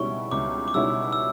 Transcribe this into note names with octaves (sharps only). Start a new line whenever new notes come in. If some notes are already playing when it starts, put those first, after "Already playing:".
Already playing: C#2 B2 G3 C#4 E4 C#6
C#2 D6
D6
B2 G3 C#4 E4 E6
E6